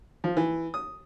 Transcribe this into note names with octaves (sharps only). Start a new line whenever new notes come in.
F3
E3
D#6